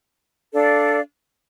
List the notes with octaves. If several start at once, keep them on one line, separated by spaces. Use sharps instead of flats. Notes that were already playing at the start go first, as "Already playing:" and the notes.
D4 A4 D5 F5